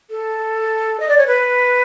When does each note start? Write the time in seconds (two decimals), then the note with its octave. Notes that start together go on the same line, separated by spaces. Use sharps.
0.10 A4
1.00 D#5
1.08 D5
1.17 C#5
1.27 B4